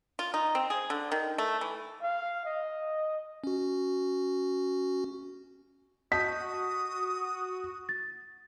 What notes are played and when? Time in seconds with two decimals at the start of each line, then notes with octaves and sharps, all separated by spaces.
0.19 F4
0.34 D#4
0.55 C4
0.70 G#4
0.90 D3
1.12 D#3
1.38 A3
1.61 E3
2.02 F5
2.45 D#5
3.44 C#4 F#4
6.12 F#4 D#5 A5 D#6 G6 B6
7.89 A6